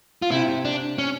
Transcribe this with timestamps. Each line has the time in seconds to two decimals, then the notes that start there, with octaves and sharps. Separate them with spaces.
0.22 F4
0.31 C3 E4
0.65 D4
0.98 C#4